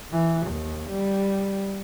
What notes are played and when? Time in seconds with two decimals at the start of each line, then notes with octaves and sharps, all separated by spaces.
0.12 E3
0.47 D#2
0.90 G3